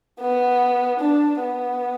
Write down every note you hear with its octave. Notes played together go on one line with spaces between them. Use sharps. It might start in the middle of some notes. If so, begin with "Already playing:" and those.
B3
D4
B3